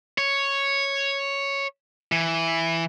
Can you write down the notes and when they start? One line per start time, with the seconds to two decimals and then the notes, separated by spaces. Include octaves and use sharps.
0.18 C#5
2.12 E3